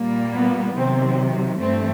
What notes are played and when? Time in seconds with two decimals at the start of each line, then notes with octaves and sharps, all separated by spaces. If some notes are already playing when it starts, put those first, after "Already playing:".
Already playing: A#2 G3 A#3
0.33 B3
0.76 C3 D#3 F#3 C4
1.60 G2 E3 A3 C4